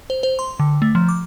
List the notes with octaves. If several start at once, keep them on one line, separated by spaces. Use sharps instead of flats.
C5
C5
C6
D3
A3
F3
D6